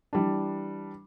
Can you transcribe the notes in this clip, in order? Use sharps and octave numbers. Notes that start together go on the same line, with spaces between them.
E3 G3 D4